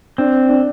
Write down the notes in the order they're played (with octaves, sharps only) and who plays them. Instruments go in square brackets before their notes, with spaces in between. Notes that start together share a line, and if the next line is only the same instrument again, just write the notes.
[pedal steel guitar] C4 [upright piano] D4
[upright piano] D4